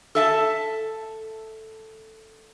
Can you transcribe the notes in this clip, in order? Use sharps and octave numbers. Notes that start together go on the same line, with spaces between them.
A4 E5 A5